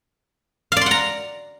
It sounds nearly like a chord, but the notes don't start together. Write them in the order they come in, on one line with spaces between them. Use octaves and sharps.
F5 D5 C6 F#5 A#5